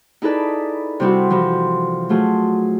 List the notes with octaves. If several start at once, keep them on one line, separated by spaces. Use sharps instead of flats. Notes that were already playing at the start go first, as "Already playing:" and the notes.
D#4 E4 G#4 A4 B4 D5
C3 G3 C4 E4 F#4
C3 E3 F3
F#3 A3 F4 G#4